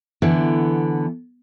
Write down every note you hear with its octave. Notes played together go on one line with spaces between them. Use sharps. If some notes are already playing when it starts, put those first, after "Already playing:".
D3 E3 B3